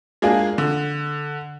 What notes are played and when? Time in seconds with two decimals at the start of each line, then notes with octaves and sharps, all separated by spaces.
0.22 G#3 A#3 D4 F4 G#4
0.58 D3